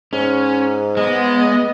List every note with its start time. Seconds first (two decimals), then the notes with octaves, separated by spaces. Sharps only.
0.13 G#2 C#4
0.97 G#3 B3 D#5